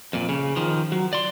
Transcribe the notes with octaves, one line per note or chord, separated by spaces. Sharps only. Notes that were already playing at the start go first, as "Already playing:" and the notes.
F2 A#2
C#3
D#3 F3
F#3
D5 C6